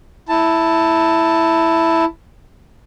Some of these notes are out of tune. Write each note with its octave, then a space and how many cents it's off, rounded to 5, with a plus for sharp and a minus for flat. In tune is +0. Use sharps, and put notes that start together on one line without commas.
E4 +0 A5 +10